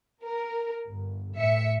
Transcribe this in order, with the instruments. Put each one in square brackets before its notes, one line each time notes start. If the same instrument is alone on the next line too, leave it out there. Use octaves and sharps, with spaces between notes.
[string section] A#4
G1
A2 E5 C#7